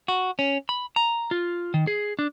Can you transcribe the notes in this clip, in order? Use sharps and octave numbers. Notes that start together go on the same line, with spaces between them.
F#4
C#4
B5
A#5
F4
D#3
G#4
D4